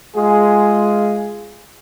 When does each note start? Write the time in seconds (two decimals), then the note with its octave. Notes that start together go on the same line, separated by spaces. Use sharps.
0.15 G#3 F4 G#4